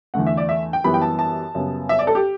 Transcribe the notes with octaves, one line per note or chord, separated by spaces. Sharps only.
E2 D3 A3 F#5
E5
D5
E5
G5
F#2 E3 G3 B3 B5
G5
A5
A5
F#2 C#3 G3 B3
E5
D5
A4
G4